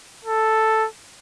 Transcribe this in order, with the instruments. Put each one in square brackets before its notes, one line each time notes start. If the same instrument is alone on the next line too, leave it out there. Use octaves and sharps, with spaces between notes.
[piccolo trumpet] A4